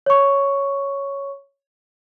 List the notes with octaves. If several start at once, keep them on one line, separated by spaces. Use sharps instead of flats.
C#5 C#6